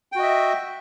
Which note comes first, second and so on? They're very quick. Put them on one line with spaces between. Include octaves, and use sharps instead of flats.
G5 F#4 D#5 E5